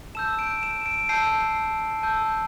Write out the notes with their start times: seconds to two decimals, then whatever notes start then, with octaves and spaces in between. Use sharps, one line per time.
0.15 A5 E6 G6 E7
0.39 D7
0.63 E7
0.86 D7
1.09 A5 E6 G6 C7
2.03 A5 E6 G6